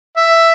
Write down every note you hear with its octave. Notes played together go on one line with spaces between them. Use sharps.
E5